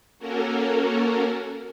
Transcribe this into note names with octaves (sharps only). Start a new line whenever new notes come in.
A#3 C#4 F#4 A4 A#4